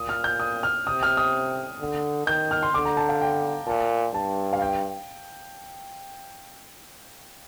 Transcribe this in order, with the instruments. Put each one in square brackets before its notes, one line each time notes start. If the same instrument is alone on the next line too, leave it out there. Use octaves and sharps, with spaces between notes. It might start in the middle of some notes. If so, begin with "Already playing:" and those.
Already playing: [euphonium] A#2 [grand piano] D#6
[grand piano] F6
G6
D#6
F6
[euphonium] C3 [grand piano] D#6
[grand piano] F6
D#6
[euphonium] D3
[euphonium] D#3 [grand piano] G6
[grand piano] F6
C6
[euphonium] D3 [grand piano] D6
[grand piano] A#5
A5
F5
G5
[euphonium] A#2 [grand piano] A5
[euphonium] G2 [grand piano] A5
[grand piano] F5
G5